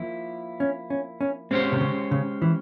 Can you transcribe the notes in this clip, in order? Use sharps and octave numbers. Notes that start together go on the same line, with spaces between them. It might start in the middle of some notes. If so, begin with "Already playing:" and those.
Already playing: F3 A#3 E4
C#4
C#4
C#4
G#3 C4 C#4 G4 C5
C3
C#3
C#3
E3